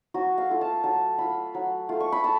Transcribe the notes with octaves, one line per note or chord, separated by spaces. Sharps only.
F#3 F#4
F5
A3 F4
A5
F#3 A5
A3 F4 B5
F#3
A3 F4
C#6
B5
A5